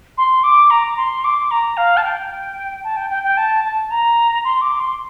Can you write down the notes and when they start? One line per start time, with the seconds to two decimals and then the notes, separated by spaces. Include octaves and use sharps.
0.18 C6
0.43 D6
0.70 A#5
0.97 C6
1.25 D6
1.51 A#5
1.77 F5
1.97 A5
2.04 G5
2.84 A5
2.97 G5
3.10 G5
3.24 G5
3.37 A5
3.64 A5
3.90 A#5
4.44 C6
4.62 D6
4.80 C6